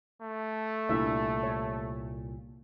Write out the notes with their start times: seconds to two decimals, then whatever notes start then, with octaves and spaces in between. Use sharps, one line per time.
0.21 A3
0.89 C2 A#2 D4 E4 E5
1.43 C#5